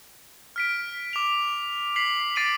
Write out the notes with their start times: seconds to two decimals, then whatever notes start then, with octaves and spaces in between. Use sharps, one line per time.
0.56 F6 B6 D7
1.13 D6 F7
1.96 B6 C7 F#7
2.36 D6 A6 C7 D7 D#7 F#7